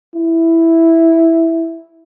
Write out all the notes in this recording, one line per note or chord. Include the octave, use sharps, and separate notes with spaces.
E4